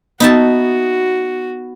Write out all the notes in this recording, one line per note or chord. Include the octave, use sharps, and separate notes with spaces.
B3 D#4 F#4 E5 A5